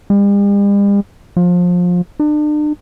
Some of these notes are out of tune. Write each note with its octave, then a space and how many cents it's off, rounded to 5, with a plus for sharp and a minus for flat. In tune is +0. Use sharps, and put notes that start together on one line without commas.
G3 +45
F3 +25
D4 +40